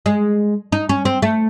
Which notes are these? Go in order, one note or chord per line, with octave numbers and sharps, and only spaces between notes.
G#3
D#4
C#4
C4
A3